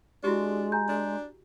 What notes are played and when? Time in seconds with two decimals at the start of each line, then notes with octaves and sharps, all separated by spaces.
0.24 G#3 D4 E4 F#4 G4
0.72 G#5 A#5 G6
0.88 D4